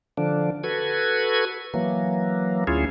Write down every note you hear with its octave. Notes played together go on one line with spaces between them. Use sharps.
D3 F3 D4
F#4 A4 B4 G#6
E3 F#3 A#3
D2 C#4 E4 F4 G#4